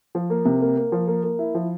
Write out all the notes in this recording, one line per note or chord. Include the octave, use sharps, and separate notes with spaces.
F3
A#3
C3
A#3
A#3
F3
A#3
A#3
E4
F3